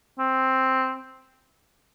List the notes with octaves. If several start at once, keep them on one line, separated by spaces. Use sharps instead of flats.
C4